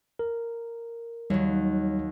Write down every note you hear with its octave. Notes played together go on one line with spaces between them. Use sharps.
A#4
D#2 F#3 G3 C#5